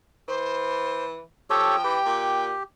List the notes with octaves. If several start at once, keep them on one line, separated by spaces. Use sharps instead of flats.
E3 C5
F3 G4 A4 C#5 G5
E3 G4
A#2